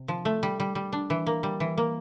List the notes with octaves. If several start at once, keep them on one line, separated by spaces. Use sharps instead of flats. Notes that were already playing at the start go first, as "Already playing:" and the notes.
Already playing: C3
F3
A3
G3
G3
G3
D4
E3
A#3
G3
E3
A#3